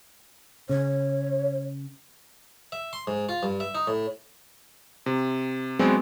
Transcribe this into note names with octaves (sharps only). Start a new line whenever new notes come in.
C#3 C#5
E5
C6
G#2
F4
G2
E5
D#4
A2
C3
F#3 G#3 B3 C4 D4